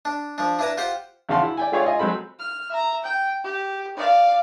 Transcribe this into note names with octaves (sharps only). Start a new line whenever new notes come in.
D4
F3 D4
D4 E4 B4 A5 A#5
F4 G4 C5 F#5 C6
E2 C#3 F#4 F5 A5 C6
E4
D5 G5 G#5
A3 F4 G#4 C#5 D5 F5
F4 D#5 G#5
F#3 G#3 C4 A4 B5
F6
E5 A#5
G5
G4
D5 F5